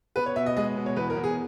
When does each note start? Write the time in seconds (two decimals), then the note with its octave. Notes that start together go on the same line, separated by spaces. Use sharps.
0.16 B3 B4
0.26 C#5
0.36 B2 E5
0.46 D#5
0.56 G#3 D#5
0.76 B2
0.86 C#5
0.96 E2 B4
1.10 A#4
1.17 E2
1.24 G#4